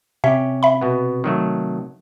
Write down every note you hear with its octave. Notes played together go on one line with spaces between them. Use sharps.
C3 C#4 G4 E5
E5 B5
B2 B3
D#3 F#3 A3